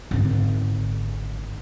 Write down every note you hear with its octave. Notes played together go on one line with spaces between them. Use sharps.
G#1 D3